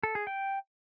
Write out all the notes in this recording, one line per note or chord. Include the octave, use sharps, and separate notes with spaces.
A4
G#4
G5